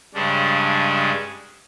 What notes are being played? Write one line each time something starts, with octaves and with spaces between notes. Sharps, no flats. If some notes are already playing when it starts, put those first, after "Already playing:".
G2 C#3 G#3 C#4 D4